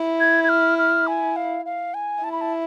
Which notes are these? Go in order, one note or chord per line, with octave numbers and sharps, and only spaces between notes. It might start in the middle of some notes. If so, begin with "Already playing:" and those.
Already playing: E4
G#6
G#6
F6
F6
G#5
F5
F5
G#5
E4 A5
B5
A5